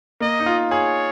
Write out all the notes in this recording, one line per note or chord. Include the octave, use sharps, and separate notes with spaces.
A#3 D#5
D#4
F4
G#4 C#5